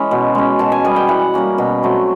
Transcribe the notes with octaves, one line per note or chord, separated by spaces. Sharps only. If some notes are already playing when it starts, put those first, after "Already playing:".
Already playing: E3 G#3 C#4
B2
G#3 C#4
B2 A5
G#5
G3 B3 G#5
G5
E3 F#5
G3 A#3 C#4
B2
F#3 A3 C4